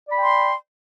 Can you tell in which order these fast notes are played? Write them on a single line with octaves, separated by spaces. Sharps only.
D5 B5 G5 C6